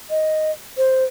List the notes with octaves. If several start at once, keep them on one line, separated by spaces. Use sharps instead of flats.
D#5
C5